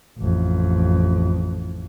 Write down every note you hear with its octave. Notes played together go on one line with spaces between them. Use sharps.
A1 F2